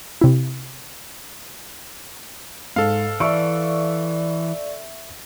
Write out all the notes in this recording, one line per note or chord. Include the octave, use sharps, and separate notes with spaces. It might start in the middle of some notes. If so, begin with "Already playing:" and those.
C3 E4
G#2 A4 F5
E3 D5 E5 C#6 E6